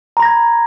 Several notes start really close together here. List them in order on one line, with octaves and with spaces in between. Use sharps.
A#5 B5 A#6 G#6